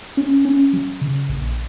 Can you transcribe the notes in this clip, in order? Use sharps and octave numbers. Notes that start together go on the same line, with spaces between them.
C#4
C#4
F#3
C#3
A#1